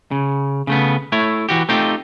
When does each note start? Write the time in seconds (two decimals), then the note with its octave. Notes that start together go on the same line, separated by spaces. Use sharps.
0.11 C#3
0.67 C#3 A3 B3
1.12 A3 E4 C#5
1.49 E3 F#4 G4
1.69 A3 C4 D#4 F4 G4